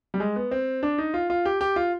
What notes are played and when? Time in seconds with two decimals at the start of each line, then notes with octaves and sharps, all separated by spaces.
0.14 G3
0.20 G#3
0.36 B3
0.51 C4
0.83 D4
0.98 D#4
1.14 F4
1.30 F4
1.45 G4
1.61 G4
1.76 F4